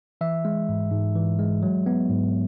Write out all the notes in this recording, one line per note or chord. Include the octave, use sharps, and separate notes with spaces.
E3 E5
G#3
G#2
G#2
E3
G#3
F#3
B3
G#2